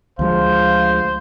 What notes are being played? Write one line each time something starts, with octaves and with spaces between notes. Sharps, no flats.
D2 F3 G#3 C5 F5